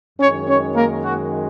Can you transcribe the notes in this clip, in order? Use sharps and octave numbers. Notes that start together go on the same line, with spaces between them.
F#2 D#3 G#3 C#4 C#5
C#4 C#5
A#3 A#4
F#4